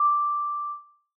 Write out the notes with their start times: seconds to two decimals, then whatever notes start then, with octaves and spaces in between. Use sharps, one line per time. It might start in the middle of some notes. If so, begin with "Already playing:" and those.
Already playing: D6